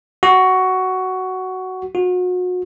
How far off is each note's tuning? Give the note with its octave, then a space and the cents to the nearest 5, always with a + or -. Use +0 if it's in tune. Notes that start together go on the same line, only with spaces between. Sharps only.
F#4 +10
F#4 -35